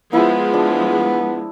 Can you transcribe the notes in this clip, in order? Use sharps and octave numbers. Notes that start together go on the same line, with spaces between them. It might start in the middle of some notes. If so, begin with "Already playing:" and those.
F3 G#3 B3 E4 D#6
D4